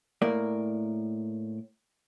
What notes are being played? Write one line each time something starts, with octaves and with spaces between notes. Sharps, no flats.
A2 A#3 A#4 D5